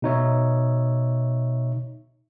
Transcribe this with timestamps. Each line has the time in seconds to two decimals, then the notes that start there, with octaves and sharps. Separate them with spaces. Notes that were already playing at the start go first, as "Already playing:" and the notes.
0.02 B2 D#4 C#5 E5